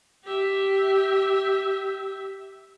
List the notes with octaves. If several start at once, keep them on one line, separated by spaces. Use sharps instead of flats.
G4 E5